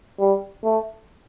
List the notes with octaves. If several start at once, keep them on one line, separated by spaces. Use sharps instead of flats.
G3
A3